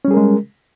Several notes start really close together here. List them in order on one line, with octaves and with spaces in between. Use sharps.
C#4 G3 G#4 A#4 G#3